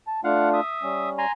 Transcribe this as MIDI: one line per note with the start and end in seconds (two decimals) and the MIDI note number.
0.07 0.21 81
0.24 0.60 57
0.24 0.60 62
0.24 0.60 65
0.24 0.49 77
0.24 0.49 78
0.54 1.09 76
0.54 1.09 87
0.83 1.26 55
0.83 1.26 61
1.18 1.32 80
1.18 1.32 82
1.18 1.32 84